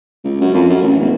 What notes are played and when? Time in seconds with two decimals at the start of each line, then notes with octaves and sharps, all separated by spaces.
0.24 C#2
0.41 F#2
0.54 F2
0.69 F#2
0.82 A1
1.00 E1